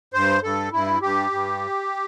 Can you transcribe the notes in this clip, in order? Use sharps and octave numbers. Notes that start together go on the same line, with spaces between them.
G2 C5
G2 A4
G2 E4
G2 G4
G2